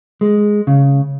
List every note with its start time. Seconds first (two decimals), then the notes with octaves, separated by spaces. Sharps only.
0.21 G#3
0.67 C#3